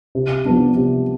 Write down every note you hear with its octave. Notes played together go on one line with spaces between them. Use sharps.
C3
F3 B3 D4
C3